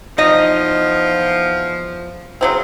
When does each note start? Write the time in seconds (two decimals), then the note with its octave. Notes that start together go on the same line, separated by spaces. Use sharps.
0.18 E2 F3 D#4 D#5
2.41 C#3 F#3 C4